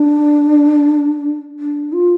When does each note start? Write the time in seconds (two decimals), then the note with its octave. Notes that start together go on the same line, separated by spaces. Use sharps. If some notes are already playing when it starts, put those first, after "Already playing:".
Already playing: D4
1.60 D4
1.93 F4